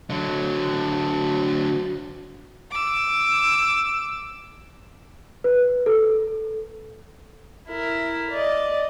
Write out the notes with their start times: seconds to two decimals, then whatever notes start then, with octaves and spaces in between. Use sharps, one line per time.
0.10 D3 F#3
2.71 D6 E6
5.44 B4
5.86 A4
7.69 E4 A#4
8.31 D5 D#5